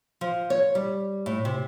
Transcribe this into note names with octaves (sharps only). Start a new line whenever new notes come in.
F3
C#5
G3
A2
C3